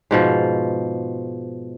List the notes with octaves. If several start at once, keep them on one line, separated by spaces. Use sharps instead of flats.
G#2 B2 F3